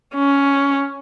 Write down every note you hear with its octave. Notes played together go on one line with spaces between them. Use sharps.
C#4